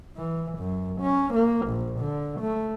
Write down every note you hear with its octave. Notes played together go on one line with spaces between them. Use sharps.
E3
F#2
C#4
A#3
A#1
D3
A3